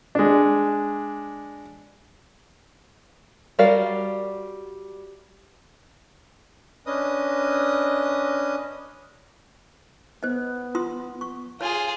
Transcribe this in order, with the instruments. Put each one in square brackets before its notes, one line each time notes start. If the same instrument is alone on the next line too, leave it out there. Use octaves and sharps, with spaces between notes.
[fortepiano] G#3 D4
[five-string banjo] G3 F#4 A#4 D5 F5
[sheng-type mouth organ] C#4 D4 B4 D#5 D#6
[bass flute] B3 [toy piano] C5 D#5
[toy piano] F4 C6 D#6
C#6
[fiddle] F4 G#4 [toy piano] C#5